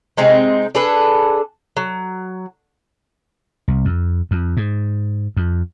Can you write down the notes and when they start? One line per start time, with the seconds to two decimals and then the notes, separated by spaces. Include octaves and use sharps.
0.17 C3 G#3 C4 D#4
0.75 D4 G#4 A4 B4
1.77 F#3
3.68 C2
3.85 F2
4.31 F2
4.57 G#2
5.37 F2